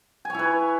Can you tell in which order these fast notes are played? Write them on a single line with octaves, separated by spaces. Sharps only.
G#5 C#5 E4 B4